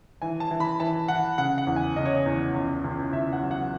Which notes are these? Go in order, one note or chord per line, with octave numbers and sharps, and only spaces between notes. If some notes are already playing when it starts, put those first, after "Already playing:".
E3 G#5
A5
E3
B5
E3 A5
E3 F#5
C#3 F#5
F#5
E2
G#5
C#3 D#5
C#5
D#5
E2
C#2
C#2
C#2 E5
F#5
F#3
F#5